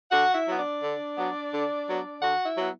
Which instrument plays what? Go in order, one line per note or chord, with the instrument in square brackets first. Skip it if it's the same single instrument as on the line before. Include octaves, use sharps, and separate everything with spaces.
[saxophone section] D3 F#4 F#5
E4 E5
F#3 B3
D4 D5
D3
F#3 B3
D3
F#3 B3
D3 F#4 F#5
E4 E5
F#3 B3